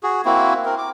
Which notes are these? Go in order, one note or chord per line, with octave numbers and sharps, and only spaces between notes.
F#4 G#4
A#3 C4 E4 F#4
C4 A#4
D6